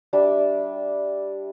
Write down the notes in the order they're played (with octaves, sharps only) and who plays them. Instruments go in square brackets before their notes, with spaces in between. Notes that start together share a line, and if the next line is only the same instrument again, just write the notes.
[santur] G3 D4 E5